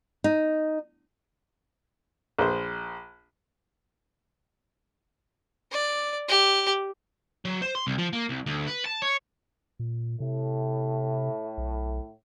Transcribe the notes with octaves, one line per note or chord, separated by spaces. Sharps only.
D#4
A#1 C5
D5
G4
F#3
C5
C6
C2
F3
A#3
C2
D2
B4
A5
C#5
A#2
A2 C3
B1